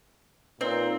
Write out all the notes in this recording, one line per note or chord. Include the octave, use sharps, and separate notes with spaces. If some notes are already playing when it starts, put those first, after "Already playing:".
A#2 C4 D#4 B4 C#5